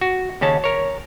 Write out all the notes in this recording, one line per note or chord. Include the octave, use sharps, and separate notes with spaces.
F#4
D#2 C#3 C#4 A5
A#4 C#5